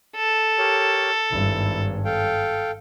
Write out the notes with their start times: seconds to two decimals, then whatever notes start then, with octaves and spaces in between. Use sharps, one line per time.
0.16 A4
0.58 G4 A#4 C#5
1.31 G#1 G2 E4
2.05 A4 F5 G5